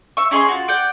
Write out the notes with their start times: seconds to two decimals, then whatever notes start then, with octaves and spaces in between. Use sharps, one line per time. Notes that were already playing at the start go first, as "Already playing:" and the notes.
0.17 E5 C#6
0.31 C#4 G#4 D#5 C6
0.48 F4 F#4
0.68 D5 F#5 G5